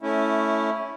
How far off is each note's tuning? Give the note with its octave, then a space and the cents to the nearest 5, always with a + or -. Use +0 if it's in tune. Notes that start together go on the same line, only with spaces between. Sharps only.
A3 +0 C#4 +0 E4 -15